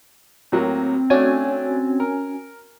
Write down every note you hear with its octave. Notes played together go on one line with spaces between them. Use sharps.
A2 F#3 A#3 C4
A3 C#4 D4 F#4 G#5
A#4